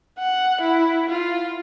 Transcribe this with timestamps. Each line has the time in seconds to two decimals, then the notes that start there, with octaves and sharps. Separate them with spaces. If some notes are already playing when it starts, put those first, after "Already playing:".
0.19 F#5
0.61 E4
1.10 F4